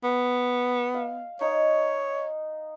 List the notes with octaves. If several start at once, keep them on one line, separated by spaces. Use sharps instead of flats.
B3
F5
D#4 C#5